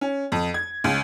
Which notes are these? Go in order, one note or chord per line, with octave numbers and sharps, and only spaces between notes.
C#4
F2
G#6
C#2